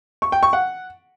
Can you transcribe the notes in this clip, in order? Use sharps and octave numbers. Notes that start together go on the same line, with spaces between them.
C#6
G5
C#6
F#5